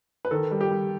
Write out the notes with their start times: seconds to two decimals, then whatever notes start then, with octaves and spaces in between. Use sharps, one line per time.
0.25 B4
0.31 D#3 A4
0.51 G3
0.61 G4
0.71 G3